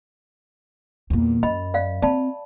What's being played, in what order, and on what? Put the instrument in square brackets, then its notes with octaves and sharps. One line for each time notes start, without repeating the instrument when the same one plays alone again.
[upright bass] E2 A#2
[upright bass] F#2 [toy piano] D#5 B5
[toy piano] D5 F5
[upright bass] C4 [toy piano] D5 A5 B5